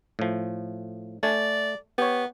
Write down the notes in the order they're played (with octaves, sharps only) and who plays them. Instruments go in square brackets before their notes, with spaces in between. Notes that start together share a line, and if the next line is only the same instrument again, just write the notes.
[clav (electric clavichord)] A2 F3
[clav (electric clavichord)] A3 G#5 [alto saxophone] D5
[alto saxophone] B3 [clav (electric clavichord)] G4 C#5